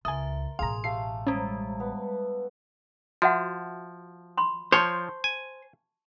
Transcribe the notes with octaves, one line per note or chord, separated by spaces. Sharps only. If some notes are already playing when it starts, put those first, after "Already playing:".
C#2 A#4 E5 G#5 C6 D#6
A1 B2 G#4 F5 A#5 C6
A3 G4 F5 C7
G3 G#3 C#4
B3
F3 F#4 E5 F#5
B5 C6
F3 C5 C#5 A5 C#6
G#5